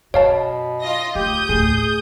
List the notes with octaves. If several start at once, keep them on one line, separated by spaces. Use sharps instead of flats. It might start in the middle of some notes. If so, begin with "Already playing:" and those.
F#2 B2 C#5 F5 A5
F4 D#5 A#6
D2 G4 D#6 G6
D#2 A2 G#4